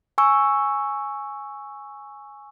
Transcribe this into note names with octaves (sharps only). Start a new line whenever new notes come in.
G#5 C#6 E6